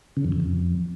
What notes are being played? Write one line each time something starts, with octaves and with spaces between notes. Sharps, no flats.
C#3
F2
E2
F2